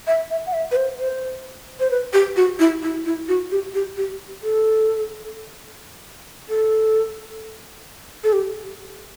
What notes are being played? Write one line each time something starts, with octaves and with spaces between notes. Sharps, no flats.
E5
E5
F#5
E5
B4
C5
C5
C5
B4
G4
F#4
E4
E4
E4
F#4
G4
G4
G4
A4
A4
A4
G4